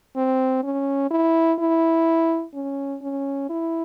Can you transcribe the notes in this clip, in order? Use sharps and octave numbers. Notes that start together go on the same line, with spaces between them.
C4
C#4
E4
E4
C#4
C#4
E4